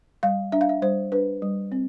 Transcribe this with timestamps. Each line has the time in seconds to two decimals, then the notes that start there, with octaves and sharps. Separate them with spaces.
0.23 G3 F5
0.52 D4 E5
0.61 F5
0.69 E5
0.82 G3 C5
1.12 D4 B4
1.42 G3
1.72 C4